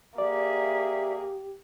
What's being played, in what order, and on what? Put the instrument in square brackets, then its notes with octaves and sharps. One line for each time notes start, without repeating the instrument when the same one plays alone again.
[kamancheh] A#3 G#4 [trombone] G4 [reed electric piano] D5 [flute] E5